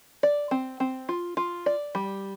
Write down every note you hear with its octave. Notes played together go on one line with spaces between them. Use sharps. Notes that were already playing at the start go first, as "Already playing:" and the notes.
D5
C4
C4
F4
F4
D5
G3